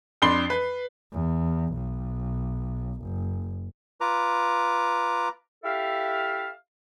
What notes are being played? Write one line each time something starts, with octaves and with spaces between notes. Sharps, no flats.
F2 D4 B5 C6 C7 G7
B4
E2
B1
F#1
F4 B4 A#5 D6
E4 G4 A4 E5 F5